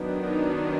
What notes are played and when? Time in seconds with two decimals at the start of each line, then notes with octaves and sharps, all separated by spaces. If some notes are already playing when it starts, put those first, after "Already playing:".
Already playing: D#3 F#3 B3 D4
0.19 D#4